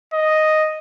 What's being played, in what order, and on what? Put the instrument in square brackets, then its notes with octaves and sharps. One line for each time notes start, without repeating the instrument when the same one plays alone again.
[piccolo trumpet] D#5